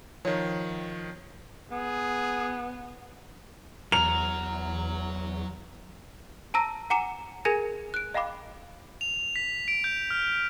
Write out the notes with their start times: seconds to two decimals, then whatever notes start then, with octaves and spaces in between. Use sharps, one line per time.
0.25 D#3 F3 C#5
1.71 B3 G#4
3.92 E2 F#3 A#5 F6 F7
6.54 A5 A#5 E6 A#6
6.90 F#5 G#5 A#5 D6 C#7 E7
7.45 G#4 A#4 G#5 G#6 A#6
7.94 F#6 D7
8.14 D#5 F5 G5 B5 D6
9.01 F7
9.36 B6
9.68 D7
9.84 G6
10.10 F6